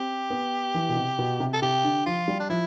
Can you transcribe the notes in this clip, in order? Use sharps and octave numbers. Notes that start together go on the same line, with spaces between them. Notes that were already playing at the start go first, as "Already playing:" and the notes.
Already playing: C4 G4
B3
E3
B2
C3
B2
C3
A4
C3 G4
D3
F3 F4
G3
D4
F3 E4